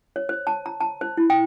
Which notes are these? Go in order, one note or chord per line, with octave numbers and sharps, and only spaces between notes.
C#5
C5
A5
A#5
A5
C5
E4
G5